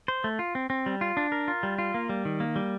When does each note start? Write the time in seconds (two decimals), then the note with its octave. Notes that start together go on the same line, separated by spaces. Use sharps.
0.08 C5
0.24 A3
0.39 F4
0.55 C4
0.70 C4
0.86 G3
1.01 F4
1.17 D4
1.32 A#4
1.48 F4
1.63 G3
1.79 F4
1.94 A#3
2.09 G3
2.25 D#3
2.40 A#3
2.56 G3